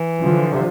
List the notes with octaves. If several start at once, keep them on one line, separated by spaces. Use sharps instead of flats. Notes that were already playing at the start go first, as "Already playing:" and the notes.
Already playing: E3
D3 F3
C3